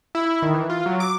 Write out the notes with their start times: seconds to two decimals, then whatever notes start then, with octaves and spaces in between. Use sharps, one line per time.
0.15 E4
0.42 D#3
0.54 E3
0.70 F4
0.86 F#3
1.00 D6